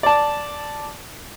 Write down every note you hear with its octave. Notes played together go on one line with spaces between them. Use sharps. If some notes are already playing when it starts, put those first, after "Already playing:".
D5 A5